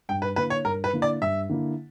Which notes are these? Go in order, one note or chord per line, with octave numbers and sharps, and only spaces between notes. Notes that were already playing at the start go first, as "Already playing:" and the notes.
G2 G5
B4
D3 A#3 E4 B4
C#5
G2 A#4
B4
D3 A#3 E4
D5
G2 E5
D3 A#3 E4